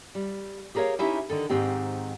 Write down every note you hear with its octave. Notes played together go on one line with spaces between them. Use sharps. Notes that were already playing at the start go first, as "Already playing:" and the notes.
G3
G4 G#4 A#4 C5 C#5 F5
C#4 D#4 E4 G4 E5
D3 D#3 A4
G#2 D#3 C4 D#4 G4